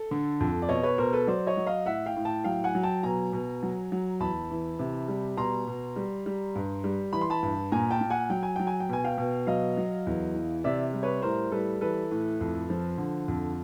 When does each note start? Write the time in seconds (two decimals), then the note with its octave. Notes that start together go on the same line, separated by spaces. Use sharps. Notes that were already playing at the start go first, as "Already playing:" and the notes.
Already playing: A4
0.11 D3
0.40 F2
0.62 D5
0.69 B2 C#5 D#5
0.83 B4 C#5
0.98 B2 A#4 C5
1.13 A4 B4
1.27 F#3 C5 D5
1.47 C#5 D#5
1.57 F#3
1.66 D#5 F5
1.86 A2 E5 F#5
2.06 F5 G5
2.16 A2
2.25 G5 A5
2.44 F#3 F5 G5
2.64 F#5 G#5
2.75 F#3
2.83 G5 A5
3.03 B2 G#5 A#5
3.33 B2
3.63 F#3
3.92 F#3
4.20 E2 A5 B5
4.50 E3
4.79 C3
5.08 G3
5.37 B2 A#5 C6
5.68 B2
5.96 G3
6.26 G3
6.55 G2
6.84 G3
7.13 E3 B5
7.21 C6
7.30 A5 B5
7.43 G2
7.72 A#2 G#5 A#5
7.91 G5 A5
8.01 A#2
8.10 F#5 G#5
8.30 F#3 G5
8.43 G#5
8.56 F#3 G5
8.67 G#5
8.80 G5
8.89 B2 G#5
9.04 F5 G5
9.18 B2
9.47 F#3 D#5 F5
9.77 F#3
10.07 E2
10.35 E3
10.64 C3 D5 E5
10.93 G3
11.03 B4 C#5
11.22 A2 A#4 C5
11.52 G3 A4 B4
11.81 E3 A4 B4
12.11 A2
12.41 F2
12.70 F3
12.98 D3
13.28 F2